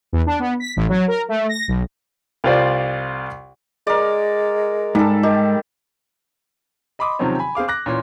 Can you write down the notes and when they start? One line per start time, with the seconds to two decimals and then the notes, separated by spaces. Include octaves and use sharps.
0.13 E2
0.26 D4
0.39 B3
0.60 B6
0.76 A1
0.89 F#3
1.08 A#4
1.29 A3
1.49 A#6
1.68 B1
2.44 C2 F4 C5 D5
3.87 G#3 A#4 D5
4.95 G#2 G3 D#4 A4
5.23 D#3 G4 D#5
6.99 D#5 B5 C6 D6 D#6
7.19 C3 D#3 F3 F#3 C4 C#4
7.39 G#5 B5
7.55 C4 G#4 F5 D6
7.68 D6 F#6 A#6
7.86 A#2 E3 C#4 C6